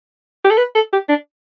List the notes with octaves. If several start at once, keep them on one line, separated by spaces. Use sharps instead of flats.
G4
A4
B4
A4
G4
D4